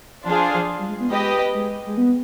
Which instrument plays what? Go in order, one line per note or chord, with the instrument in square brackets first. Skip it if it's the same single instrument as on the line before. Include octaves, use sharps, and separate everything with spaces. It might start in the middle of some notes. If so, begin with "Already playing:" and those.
[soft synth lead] F3 [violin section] D4 F4 G#4 C5 F5
[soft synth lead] F3
G3
G#3
B3
[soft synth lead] G#3 [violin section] G4 B4 D#5
[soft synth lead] G#3
G#3
B3